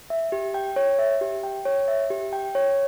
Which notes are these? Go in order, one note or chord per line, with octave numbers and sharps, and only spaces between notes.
E5
G4
G5
C#5
E5
G4
G5
C#5
E5
G4
G5
C#5